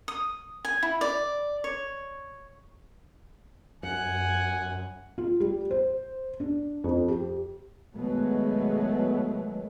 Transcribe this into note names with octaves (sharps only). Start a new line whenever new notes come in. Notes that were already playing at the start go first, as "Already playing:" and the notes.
D#6
G#5
E4
D5
C#5
F#2 F#5 G#5
F4
G3
C5
D4
F2
G4
B2 D#3 F#3 G#3 A3 B3